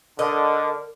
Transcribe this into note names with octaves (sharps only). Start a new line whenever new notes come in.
D3 A#4 D#5